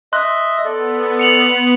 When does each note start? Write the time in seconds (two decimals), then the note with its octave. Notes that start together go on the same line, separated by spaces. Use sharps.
0.13 D#5 E5 C6 F#6
0.65 B3 A4 D5
1.19 C#7 F7 F#7